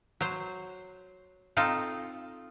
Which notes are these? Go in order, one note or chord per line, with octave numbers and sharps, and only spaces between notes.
F#3 C5
C4 D#4 F4 A4